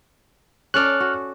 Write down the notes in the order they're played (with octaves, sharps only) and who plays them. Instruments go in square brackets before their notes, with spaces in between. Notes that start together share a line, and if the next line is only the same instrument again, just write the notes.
[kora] C#4 A4 D5 [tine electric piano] F6 F#6
[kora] F#4